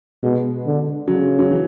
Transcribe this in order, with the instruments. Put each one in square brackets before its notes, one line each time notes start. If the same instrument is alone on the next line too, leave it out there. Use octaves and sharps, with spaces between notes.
[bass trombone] B2 [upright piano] G#3
[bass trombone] D3
[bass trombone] C#3 [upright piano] F#3
[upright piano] F#3
E3